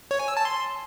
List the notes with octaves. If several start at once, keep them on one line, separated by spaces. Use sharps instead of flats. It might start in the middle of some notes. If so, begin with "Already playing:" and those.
C#5
G#5
E6
A5
C6